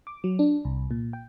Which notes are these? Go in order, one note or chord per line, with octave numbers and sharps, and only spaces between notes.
D6
F#3
D4
C2
A#2
G5